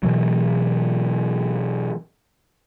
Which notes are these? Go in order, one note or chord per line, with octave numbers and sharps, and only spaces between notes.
B2 E3 F#3